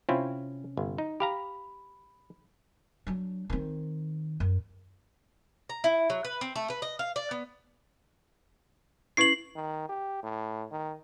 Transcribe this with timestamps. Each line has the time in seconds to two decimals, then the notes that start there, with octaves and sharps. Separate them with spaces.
0.09 C3 C4 C#4 E4 F4
0.77 G1
0.98 D#4
1.20 G4 F5 A#5 B5
3.07 F#3 D4
3.50 D#3 C4
4.40 F#2
5.69 A#5
5.84 E4
6.10 F#3
6.25 B4
6.41 C4
6.56 A3
6.70 B4
6.82 D#5
6.99 F5
7.16 D5
7.31 B3
9.17 C#4 E4 B4 C7 F#7
9.56 D#3
9.89 G4
10.23 A2
10.71 D#3